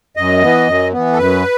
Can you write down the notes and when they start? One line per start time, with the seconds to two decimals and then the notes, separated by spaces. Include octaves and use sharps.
0.17 F#2 D#5
0.43 E3 B3
0.67 F#2
0.93 E3 B3
1.13 A4
1.18 F#2 B4